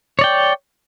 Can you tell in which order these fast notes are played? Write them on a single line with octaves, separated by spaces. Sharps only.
C#5 D5 G5